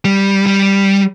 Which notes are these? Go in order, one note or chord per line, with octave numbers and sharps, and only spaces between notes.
G3
G3